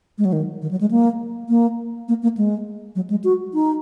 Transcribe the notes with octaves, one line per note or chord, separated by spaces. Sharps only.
G#3
F#3
D#3
D#3
F#3
G#3
A#3
A#3
A#3
A#3
G#3
F#3
G#3
F#4
D#4